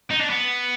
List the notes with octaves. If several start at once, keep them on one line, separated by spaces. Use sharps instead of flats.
D#4
D4
B3